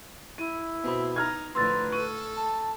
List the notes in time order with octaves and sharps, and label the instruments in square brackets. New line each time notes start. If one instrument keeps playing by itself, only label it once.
[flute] E4 [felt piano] D#7
[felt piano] B2 B5 [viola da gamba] B3 C4
[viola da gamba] D#4 [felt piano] A#5 F6 G#6
[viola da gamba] A2 D3 F3 [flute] B4 [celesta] C6 E6 A6
[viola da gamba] A4 [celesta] C#6 [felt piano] D#7
[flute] A5